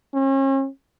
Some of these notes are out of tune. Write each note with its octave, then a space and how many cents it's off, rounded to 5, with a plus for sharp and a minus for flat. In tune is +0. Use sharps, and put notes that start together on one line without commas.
C#4 -40